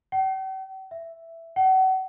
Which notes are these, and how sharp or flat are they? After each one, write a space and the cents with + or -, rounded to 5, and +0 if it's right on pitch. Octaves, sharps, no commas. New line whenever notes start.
G5 -45
E5 +5
F#5 +35